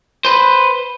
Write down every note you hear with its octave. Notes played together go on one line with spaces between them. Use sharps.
B4 C5